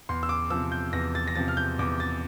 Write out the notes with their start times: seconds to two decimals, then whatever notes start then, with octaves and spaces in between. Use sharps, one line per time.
0.09 E2 C6
0.23 E6
0.29 D6
0.50 C3 F3 E6
0.72 G6
0.93 E2 A#6
1.15 A6
1.28 A#6
1.35 C3 F3 A6
1.48 F6
1.57 G6
1.79 E2 D6
2.00 A6